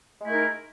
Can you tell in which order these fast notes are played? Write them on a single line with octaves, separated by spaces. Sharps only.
G#3 A3 E4 A#4 D#4